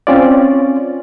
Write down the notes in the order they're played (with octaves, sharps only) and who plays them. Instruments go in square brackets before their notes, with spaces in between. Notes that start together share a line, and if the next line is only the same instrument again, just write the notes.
[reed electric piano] C4 C#4 F4 D5